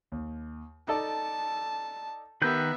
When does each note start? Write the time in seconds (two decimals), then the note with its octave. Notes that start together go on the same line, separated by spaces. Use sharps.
0.12 D#2
0.88 D#4 A4 D5 A5
2.42 D#3 B3 G4 A#4 B4 E5 G6